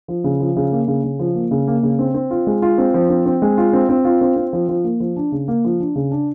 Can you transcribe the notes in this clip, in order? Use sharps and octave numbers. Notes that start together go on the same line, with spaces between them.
F3
C#3
F3
C#3
A#3
C#3
C#3
F3
A#3
C#3
A#3
C#3
C4
C4
F4
G#3
F4
C4
F3
C4
C4
G#3
F4
C4
C4
F4
C4
C4
F3
F3
A#3
F3
D4
C#3
A#3
F3
D4
C#3
D4